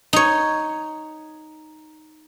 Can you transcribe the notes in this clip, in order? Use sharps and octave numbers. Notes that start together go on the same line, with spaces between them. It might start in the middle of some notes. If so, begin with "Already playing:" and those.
D#4 C#5